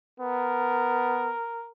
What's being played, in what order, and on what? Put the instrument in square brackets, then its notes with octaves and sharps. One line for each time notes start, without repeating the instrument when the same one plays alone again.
[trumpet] B3 [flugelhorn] A#4